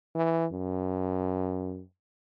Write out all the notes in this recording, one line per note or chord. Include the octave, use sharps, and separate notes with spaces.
E3
F#2